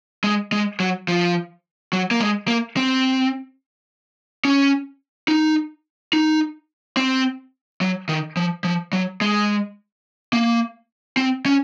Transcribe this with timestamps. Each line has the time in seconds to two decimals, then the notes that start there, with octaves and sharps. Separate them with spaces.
0.24 G#3
0.52 G#3
0.80 F#3
1.08 F3
1.93 F#3
2.11 A#3
2.20 G#3
2.48 A#3
2.77 C4
4.45 C#4
5.28 D#4
6.13 D#4
6.97 C4
7.81 F#3
8.09 D#3
8.37 F3
8.64 F3
8.93 F#3
9.21 G#3
10.33 A#3
11.17 C4
11.46 C#4